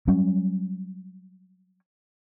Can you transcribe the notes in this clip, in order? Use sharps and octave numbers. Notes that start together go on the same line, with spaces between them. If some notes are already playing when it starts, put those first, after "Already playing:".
F#3 G3 C#4